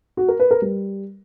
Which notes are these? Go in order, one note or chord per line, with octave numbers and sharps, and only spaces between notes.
F#4
A#4
B4
A#4
G3